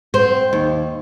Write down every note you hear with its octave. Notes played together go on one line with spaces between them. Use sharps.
C4
D#2